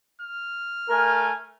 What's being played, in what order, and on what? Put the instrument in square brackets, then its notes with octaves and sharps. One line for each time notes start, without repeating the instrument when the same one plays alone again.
[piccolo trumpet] F6
[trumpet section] A3 G#5 [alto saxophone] A#4